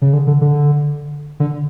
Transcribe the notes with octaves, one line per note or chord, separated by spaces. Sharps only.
C#3
D3
D3
D3
D3